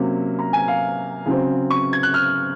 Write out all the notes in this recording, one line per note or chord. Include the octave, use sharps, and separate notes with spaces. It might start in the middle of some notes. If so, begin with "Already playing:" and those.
Already playing: C3 F#3 A#3 C#4
A#5
G#5
F5
C#3 F#3 C4
C#6
G#6
F#6
F6